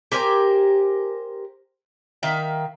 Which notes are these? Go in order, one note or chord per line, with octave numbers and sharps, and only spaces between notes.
G4 A#4 C5 G#5
D#3 E5 F5